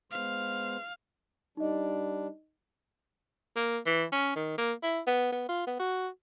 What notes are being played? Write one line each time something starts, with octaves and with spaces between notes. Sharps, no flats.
G#3 B3 C5 F5
G3 D4 D#4 D#5
A#3
E3
C#4
D#3
A#3
E4
B3
B3
F4
B3
F#4